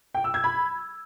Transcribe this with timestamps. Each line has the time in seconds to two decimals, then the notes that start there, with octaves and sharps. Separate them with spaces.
0.15 G5
0.24 E6
0.34 G#6
0.44 B5